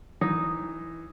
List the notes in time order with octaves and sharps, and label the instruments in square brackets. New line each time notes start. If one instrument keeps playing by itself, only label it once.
[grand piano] E3 [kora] D#4